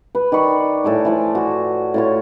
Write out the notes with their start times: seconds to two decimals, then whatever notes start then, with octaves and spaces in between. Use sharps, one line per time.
0.15 B4
0.32 D#3 D5 B5 C#6
0.84 A2 A4 G#5 D6
1.05 E3 F3 D5
1.35 F#4
1.94 A2 F4 C#5